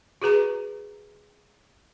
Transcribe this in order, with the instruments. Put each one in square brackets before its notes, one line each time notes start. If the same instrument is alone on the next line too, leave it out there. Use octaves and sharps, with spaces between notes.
[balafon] F#4 G#4 B4 A#5